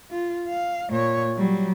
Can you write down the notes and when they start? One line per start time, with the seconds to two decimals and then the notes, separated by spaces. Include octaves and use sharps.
0.11 F4
0.49 F5
0.90 A#2 C#5
1.37 F#3 G3